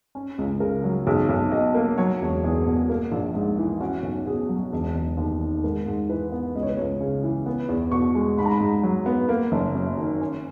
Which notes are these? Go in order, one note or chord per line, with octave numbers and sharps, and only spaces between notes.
C#4
C#2
C#3 A#4
F#3
B1 G#4
B1
B2 D#5
A#3
F#3 C#5
E1
E2 G#4
B2
A#3
A#1
G#2
E3
C#4 F#4
B1
B2 G#4
F#3
E1
E1
D#2
D#3
G#2 A#4
G#2
E3 B4
B3
C#2 D#5
C#5
B4
C#2 C#5
C#3
E3
B3
E2
B2 C#6
G#3
G#2 B5
A#5
B5
G#2
F#3
B3
A#3
F#1
F#2
D#3
C#4